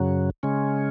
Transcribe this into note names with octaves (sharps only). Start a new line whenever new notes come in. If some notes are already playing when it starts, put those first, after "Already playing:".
Already playing: F#2 C#3 F#3
C#3 G#3 C#4